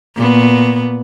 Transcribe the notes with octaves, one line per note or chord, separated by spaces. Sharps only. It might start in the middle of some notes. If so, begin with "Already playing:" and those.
A#2 B3